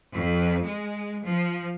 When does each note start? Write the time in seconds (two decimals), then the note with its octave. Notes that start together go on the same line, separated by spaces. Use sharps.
0.15 F2
0.66 G#3
1.25 F3